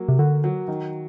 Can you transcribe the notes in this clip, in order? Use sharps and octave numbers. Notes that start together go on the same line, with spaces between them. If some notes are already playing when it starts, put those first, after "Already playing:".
Already playing: F#3 A#3
C3
D3 F#4
F#3
D#3